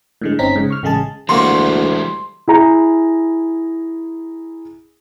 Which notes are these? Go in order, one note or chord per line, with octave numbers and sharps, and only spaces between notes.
A2 D3 G#3
G1 C4 C#4 D#4 A#5 B6
G#2 C#3
C#6 F6
A1 C#3 G#3 G#4 A5
D2 E3 G3 G#3 A#3 F#4 C6 C#6
E4 G#4 A#5